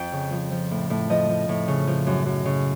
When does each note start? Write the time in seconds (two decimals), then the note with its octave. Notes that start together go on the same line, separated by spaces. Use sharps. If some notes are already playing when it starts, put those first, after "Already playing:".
Already playing: F2 F3 G5
0.12 C#3
0.32 F3
0.52 F3
0.71 A2
0.90 A2
1.10 F3 D#5
1.29 F3
1.49 A2
1.68 C#3
1.87 F3
2.07 F#2
2.26 F#2
2.45 C#3